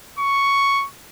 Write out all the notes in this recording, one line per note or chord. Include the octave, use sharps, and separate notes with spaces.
C#6